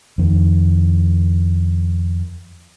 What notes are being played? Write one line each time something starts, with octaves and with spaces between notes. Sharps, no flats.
F2 D#3